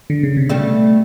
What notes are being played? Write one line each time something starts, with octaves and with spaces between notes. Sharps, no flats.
D3
C#3
C3
B2 G3 A3